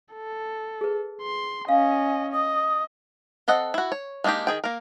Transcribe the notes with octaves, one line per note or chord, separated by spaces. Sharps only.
A4
G#4 B4
C6
C#4 D#5 F5 G#5
D#5 D#6
C4 A4 D#5 F#5
E4 F#4
C#5
G#3 A#3 D4 D#4 G4
D#3 G#4 G5
A#3 A#4